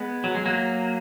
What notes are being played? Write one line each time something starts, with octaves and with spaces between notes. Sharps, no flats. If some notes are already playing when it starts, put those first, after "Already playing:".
Already playing: G#3 B3
F#3
G#3
F#3 A#3